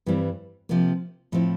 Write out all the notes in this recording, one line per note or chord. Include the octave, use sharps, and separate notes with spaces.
G2 E3 G3 C4
C3 F3 A#3
A2 F3 C4 E4